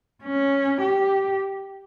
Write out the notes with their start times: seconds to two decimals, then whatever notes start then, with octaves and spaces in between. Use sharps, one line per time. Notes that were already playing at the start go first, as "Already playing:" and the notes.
0.23 C#4
0.81 G4